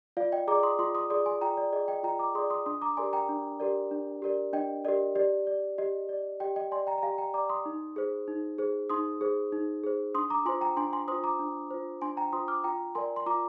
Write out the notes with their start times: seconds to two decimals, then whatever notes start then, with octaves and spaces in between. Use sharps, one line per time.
0.17 F4 D5 F5
0.32 D#5 G5
0.47 G#4 D5 A#5 D6
0.63 C6 D#6
0.79 F4 C6 D#6
0.95 C6 D#6
1.10 G#4 D5 C6 D#6
1.26 G#5 C6
1.41 F4 G5 A#5
1.57 D5
1.72 G#4 D5 D#5
1.88 D#5 G5
2.03 F4 G5 A#5
2.19 A#5 D6
2.35 G#4 D5 C6 D#6
2.50 C6 D#6
2.66 D4 C6 D#6
2.81 A#5 D6
2.97 G4 A#4 D5 G#5 C6
3.13 G5 A#5
3.29 D4
3.60 G4 A#4 D5
3.91 D4
4.22 G4 A#4 D5
4.53 D4 D#5 G5
4.85 G4 A#4 D5 D#5
5.16 G4 D5
5.47 D5
5.78 G4 D#5
6.09 D5
6.40 G4 D#5 G5
6.56 D#5 G5
6.72 D5 G#5 C6
6.87 G5 A#5
6.98 A#5
7.03 G4 F5 G#5
7.18 G5 A#5
7.34 D5 A#5 D6
7.50 C6 D#6
7.66 D#4
7.96 G#4 C5
8.28 D#4
8.58 G#4 C5
8.90 D#4 C6 D#6
9.21 G#4 C5
9.52 D#4
9.84 G#4 C5
10.15 D4 C6 D#6
10.30 A#5 D6
10.45 F4 C5 G#5 C6
10.61 G5 A#5
10.77 D4 G#5 C6
10.93 G#5 C6
11.08 F4 C5 C6 D#6
11.24 A#5 D6
11.39 D4
11.71 F4 C5
12.02 D4 G#5 C6
12.17 G5 A#5
12.32 F4 C5 C6 D#6
12.48 D6 F6
12.64 F4 G5 A#5
12.95 A#4 D5 G#5 C6
13.16 C6
13.26 F4 A#5 D6